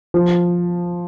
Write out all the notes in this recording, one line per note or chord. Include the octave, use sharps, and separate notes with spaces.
F3